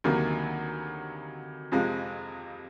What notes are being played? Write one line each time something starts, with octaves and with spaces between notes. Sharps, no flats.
D2 C3 D#3 F#3 A#3
F2 C3 F3 G#3